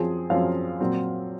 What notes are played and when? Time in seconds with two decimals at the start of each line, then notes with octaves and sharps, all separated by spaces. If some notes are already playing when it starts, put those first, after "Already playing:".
Already playing: F#2 F3 C4 G#4
0.30 F#2 F3 C4 F5
0.81 A#2 F#3 C4